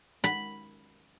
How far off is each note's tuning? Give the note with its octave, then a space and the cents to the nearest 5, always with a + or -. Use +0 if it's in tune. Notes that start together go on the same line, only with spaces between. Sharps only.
B5 +0